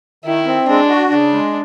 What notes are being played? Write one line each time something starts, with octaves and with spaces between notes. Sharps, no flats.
D#3 E4
C4
G#3 D4
F#4
C#3 D4
G#3